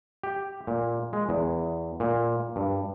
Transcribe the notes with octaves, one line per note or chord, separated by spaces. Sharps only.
G4
A#2
G#3
E2
A#2
G2